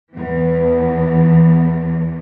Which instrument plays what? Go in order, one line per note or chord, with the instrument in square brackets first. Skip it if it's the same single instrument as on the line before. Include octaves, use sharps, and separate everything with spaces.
[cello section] E2 E3 [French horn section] B3